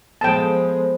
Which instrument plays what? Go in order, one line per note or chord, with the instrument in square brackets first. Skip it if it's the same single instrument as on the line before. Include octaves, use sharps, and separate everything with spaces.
[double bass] F3 G#3 [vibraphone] B3 A4 C5 [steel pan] G5 A5